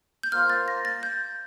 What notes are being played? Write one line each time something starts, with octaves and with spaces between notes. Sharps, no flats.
G6
A#3 F4 C5 F5 F6
A6
A#6
A6
G6